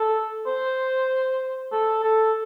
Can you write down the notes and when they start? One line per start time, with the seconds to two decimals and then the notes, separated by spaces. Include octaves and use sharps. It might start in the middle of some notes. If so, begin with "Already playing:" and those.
Already playing: A4
0.46 C5
1.72 A4
2.03 A4